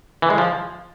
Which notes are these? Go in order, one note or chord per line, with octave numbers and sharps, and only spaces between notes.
E3
G#3
F3